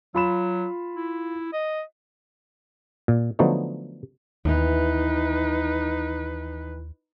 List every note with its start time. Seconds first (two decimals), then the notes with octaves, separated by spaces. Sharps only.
0.15 F#3 F4 B5 E7
0.96 E4
1.53 D#5
3.08 A#2
3.39 D3 F3 F#3 A3 B3 D#4
4.45 D#2 E3 B3 D#4 E4 B4